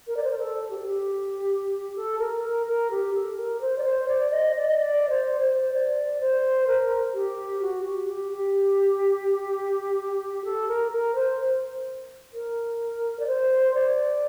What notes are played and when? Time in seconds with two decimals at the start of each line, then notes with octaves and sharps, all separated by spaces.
0.07 A#4
0.17 D5
0.24 C5
0.31 A#4
0.38 A4
0.70 G4
0.78 A4
0.86 G4
1.96 A4
2.19 A#4
2.43 A#4
2.67 A#4
2.90 G4
3.14 A4
3.37 A#4
3.61 C5
3.78 D5
3.84 C5
4.08 D5
4.31 D#5
4.55 D5
4.68 D#5
4.78 D5
5.09 C5
5.41 C5
5.73 D5
6.20 C5
6.67 A#4
7.14 G4
7.61 F#4
7.85 G4
8.09 G4
8.32 G4
10.45 A4
10.68 A#4
10.91 A#4
11.15 C5
12.33 A#4
13.19 D5
13.27 C5
13.74 D5